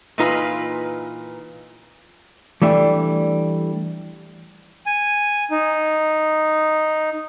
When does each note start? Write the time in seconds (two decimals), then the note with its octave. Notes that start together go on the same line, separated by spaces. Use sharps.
0.18 A#2 E3 D#4 F4 B4 A#5
2.62 E3 G3 A3 D4
4.86 G#5
5.51 D#4